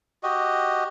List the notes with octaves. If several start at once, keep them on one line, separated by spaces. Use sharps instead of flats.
F#4 G4 D#5